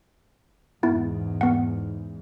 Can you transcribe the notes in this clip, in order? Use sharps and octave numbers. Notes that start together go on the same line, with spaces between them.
E2 G#2 B3 E4
B3 F#5